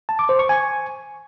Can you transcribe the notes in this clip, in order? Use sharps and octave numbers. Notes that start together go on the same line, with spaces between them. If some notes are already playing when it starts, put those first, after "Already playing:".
A5
D6
C5
C#6
G#5